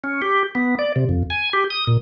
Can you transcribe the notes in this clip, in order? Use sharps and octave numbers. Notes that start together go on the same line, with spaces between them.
C#4
G4
B3
D5
C3
F2
G#5
G4
D#6
A#2